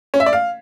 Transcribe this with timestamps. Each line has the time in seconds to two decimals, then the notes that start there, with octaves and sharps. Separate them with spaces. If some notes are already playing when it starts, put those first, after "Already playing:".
0.14 C#4
0.20 E5
0.26 D5
0.33 F5